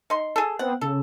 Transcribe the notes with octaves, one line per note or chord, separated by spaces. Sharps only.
D#4 C6
G#4 A4
B3 C4 F#5
C#3 A4